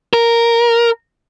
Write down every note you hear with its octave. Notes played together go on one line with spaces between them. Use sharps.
A#4